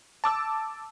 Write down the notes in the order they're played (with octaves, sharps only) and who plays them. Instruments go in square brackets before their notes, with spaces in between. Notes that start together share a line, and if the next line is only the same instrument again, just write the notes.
[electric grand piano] A5 D6 E6